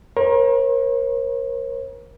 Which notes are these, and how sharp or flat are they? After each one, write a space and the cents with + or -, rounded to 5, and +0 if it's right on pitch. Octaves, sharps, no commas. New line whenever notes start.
A#4 +30 C#5 -45